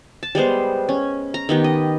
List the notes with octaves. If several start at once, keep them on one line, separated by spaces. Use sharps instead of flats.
A5
G3 G#3 B3 C5
C#4
A#5
D#3 B3 G4
D#5